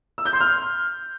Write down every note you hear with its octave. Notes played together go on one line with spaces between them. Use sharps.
E6
G6
C6
F6